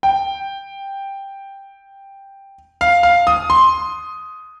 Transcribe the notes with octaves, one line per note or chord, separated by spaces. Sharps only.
G5
F5
F5
D#6
C6